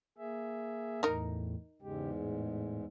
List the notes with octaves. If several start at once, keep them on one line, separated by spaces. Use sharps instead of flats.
A#3 G#4 E5
E2 A2 D#4 A#4
E2 G#2 C#3 G#3 G4
A2